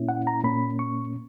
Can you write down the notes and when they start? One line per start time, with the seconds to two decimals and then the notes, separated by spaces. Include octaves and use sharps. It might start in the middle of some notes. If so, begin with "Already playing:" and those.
Already playing: A#2 A#3 C#4 E4
0.09 F#5
0.27 A#5
0.44 A#2 A#3 C#4 B5
0.79 C#6